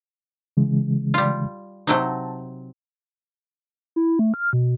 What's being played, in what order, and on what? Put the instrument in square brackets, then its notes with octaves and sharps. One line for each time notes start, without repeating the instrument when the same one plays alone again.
[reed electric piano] C#3 E3 G#3
[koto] G3 F4
[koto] C3 F#3 D#4 [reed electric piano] A5
[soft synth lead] E4
A3
F6
B2